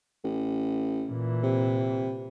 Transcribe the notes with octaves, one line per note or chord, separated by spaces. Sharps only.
A1
A#2 E3
C3